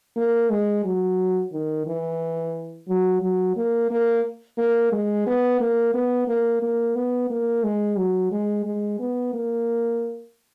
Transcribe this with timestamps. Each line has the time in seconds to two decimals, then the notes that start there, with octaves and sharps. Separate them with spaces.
0.17 A#3
0.50 G#3
0.84 F#3
1.53 D#3
1.87 E3
2.88 F#3
3.22 F#3
3.56 A#3
3.91 A#3
4.58 A#3
4.92 G#3
5.27 B3
5.60 A#3
5.94 B3
6.28 A#3
6.62 A#3
6.96 B3
7.30 A#3
7.64 G#3
7.98 F#3
8.32 G#3
8.66 G#3
9.00 B3
9.34 A#3